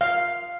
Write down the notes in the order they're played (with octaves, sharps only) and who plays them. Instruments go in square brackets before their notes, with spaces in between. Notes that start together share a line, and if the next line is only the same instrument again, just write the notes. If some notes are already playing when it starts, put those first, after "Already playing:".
[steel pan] F5